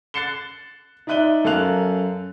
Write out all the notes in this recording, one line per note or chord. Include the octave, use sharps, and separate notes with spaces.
F#6 A6 C7 C#7 E7 G7
D#4 D5 E5 F#6 D#7 G7
F#2 A4 A#4 F5 F#6 F7